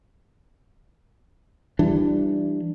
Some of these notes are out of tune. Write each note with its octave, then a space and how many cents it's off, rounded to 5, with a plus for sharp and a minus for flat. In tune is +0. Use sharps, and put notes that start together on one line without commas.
E3 +30 G3 +0 D4 +15